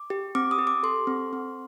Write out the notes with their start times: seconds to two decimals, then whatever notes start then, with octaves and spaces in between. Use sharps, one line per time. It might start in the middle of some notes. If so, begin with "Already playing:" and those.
Already playing: D6
0.10 G4
0.35 C4 D6
0.51 D#6
0.59 G4
0.67 D6
0.83 A4 C6
1.07 C4
1.33 C4